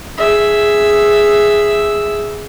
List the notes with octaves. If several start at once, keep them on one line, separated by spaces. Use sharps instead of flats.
G#4 E5